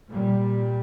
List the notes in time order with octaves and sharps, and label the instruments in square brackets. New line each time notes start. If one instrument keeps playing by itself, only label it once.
[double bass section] A#2 G3